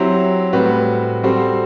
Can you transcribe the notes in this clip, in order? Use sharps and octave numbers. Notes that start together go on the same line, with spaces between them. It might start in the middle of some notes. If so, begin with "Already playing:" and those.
Already playing: F#3 C4 E4 G4 C5
A2 G3 C4 F#4 B4
G3 C4 F#4 A4 C5